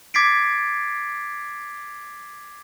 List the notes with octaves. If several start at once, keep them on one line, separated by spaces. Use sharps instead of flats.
D6 G#6 A6 B6 C7 D7